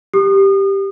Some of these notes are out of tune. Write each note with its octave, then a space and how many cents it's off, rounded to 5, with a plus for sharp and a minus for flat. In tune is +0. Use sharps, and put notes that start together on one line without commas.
G4 +0 D#6 -40